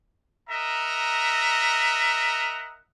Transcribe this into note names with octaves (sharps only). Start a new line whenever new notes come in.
A#4 D#5 E5 F#5 A#5